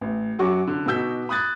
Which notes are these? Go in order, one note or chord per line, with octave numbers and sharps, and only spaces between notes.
A1
F#2 F#3 F#4 C#6 D6
D3
B2 D#4 F#4 E6 G6 B6
B5 D#6 F#6 G#6 A6